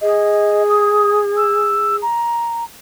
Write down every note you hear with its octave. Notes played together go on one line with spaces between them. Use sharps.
G#4 D#5
D#6
E6
A#5